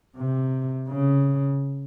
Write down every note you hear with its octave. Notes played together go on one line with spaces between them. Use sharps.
C3
C#3